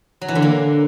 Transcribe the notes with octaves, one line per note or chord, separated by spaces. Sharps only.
F#3
E3
D3
A#3